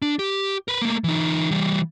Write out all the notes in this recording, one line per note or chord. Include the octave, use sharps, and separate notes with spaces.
D4
G4
A#4 B4
A3 A#3
E3 D#4
E3 G3